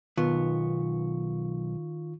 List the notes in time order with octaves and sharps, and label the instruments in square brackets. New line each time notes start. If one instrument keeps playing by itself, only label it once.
[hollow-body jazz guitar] B1 B3 [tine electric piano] D#3 F4 C#6